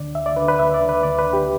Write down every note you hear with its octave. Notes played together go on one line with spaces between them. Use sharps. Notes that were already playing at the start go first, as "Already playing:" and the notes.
Already playing: D2 D3 D5
D2 E5
D5
D3 B4
B4
D2 E5
D5
D3
B4
D2 D5
B4
D3
G4